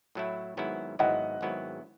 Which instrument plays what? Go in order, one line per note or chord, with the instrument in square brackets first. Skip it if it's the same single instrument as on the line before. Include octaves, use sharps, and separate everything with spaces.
[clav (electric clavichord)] A2 F#3 A3 E4
G#1 G#2 F#3 B3 E4
[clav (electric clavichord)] G#1 G#2 F#3 B3 E4 [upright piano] D#5 F#5
[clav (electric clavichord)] G#1 G#2 F#3 B3 E4